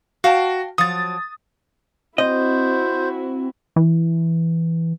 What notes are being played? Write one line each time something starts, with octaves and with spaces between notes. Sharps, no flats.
F#4 F5 G5 A5
F3 F#3 D#6 A6
C4 E4 F#4 C5 D#5
E3